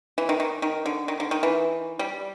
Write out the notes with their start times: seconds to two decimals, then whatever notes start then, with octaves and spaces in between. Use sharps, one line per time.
0.18 E3
0.29 D#3
0.40 D#3
0.62 D#3
0.86 D3
1.08 D#3
1.20 D3
1.31 D#3
1.43 E3
1.99 G3